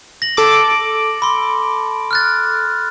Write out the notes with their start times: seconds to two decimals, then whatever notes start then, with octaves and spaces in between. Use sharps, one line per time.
0.22 A#6 F#7
0.37 A4 D6
1.22 B5 C6
2.11 F6 F#6 A6